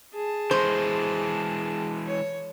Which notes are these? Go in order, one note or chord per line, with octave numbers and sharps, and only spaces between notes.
G#4 A5
E3 G#3 C5
C#5